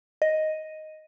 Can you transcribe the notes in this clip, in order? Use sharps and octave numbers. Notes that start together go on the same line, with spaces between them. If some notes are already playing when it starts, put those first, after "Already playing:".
D#5